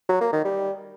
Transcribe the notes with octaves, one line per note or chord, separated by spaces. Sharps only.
F#3
A#3
D#3
G3